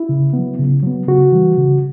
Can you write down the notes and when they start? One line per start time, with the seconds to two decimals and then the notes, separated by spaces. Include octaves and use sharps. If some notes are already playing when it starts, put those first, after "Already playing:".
Already playing: E4
0.09 C#3
0.33 B3
0.38 F#3
0.59 C#3
0.83 F#3 B3
1.08 C#3 F#4
1.32 E3 G3
1.57 C#3